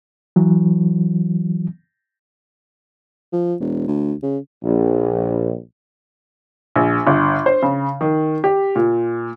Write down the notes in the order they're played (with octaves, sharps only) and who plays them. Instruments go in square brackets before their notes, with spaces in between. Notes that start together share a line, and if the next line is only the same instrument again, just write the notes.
[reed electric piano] E3 F#3
[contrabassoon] F3
E1
D2
C#3
[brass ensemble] A#1
[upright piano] A#1
G1
C5
C#3
D#3
G4
A#2